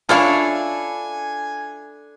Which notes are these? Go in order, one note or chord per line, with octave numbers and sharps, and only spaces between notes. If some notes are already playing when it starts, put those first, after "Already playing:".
D4 E4 F4 A4 C#5 F5 G#5